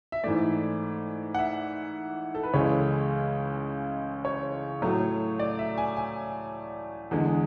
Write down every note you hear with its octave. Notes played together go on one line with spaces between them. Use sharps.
E5
G#2 E3 A3 D5
F#5
E5
A4
B4
C#2 C#3 E3 G#3 C#5
C#5
A2 F#3 A3
D5
E5
G#5
G#5
E2 D3 G#3